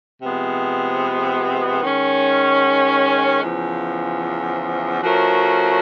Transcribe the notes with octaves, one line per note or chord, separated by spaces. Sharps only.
C3 F3 G#3 B3
D#3 G#3 C#4
E2 C#3 F3
F3 A3 C#4 F#4 A#4